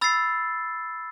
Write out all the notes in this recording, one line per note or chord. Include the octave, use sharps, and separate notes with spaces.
B5 E6 A6 C7